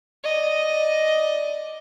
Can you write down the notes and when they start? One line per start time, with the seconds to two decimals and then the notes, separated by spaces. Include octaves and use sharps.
0.24 D5 D#5